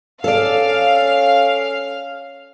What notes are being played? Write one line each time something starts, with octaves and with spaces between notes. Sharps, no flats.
C#4 A4 D5 F5